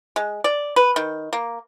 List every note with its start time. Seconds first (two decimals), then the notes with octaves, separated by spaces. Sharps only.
0.16 G#3
0.44 D5
0.76 B4
0.96 D#3
1.33 A#3